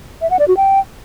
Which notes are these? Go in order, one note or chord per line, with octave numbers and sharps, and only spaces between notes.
E5
F#5
D5
F#4
G5